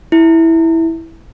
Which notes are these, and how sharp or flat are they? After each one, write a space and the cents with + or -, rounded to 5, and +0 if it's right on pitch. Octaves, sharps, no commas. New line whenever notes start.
E4 -10